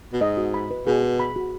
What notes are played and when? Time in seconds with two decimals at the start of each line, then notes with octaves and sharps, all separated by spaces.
0.13 B2
0.21 G#2 D#5
0.37 F#4
0.54 B5
0.71 B4
0.87 B2 G#4
1.03 G#4
1.20 B5
1.36 F#4